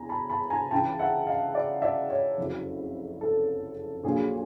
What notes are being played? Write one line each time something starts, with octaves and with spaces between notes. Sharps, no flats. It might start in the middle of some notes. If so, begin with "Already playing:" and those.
Already playing: E2 G#5 A#5
A5 B5
A5 B5
G#5 A#5
C#2 C#3 E3 G5 A5
E5 F#5
D#5 F5
D5 E5
D5 E5
C#5 D#5
F#1 F2 C#3 F#3
A4
A#1 A#2 F#3 G#4